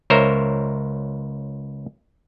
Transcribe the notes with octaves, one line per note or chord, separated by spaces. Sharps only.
C#2 A#4 C5 C#5 E5 A#5